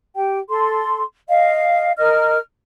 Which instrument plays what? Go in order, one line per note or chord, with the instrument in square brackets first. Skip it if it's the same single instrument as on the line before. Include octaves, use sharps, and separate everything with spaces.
[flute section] G4 G5
A4 C6
D#5 F5
A#4 D#5 F6